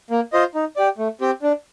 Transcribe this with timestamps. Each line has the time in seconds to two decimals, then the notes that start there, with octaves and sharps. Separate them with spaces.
0.10 A#3
0.33 F4 C5 D#5
0.55 D#4
0.76 G4 D5
0.98 A3
1.21 C4 G4
1.42 D4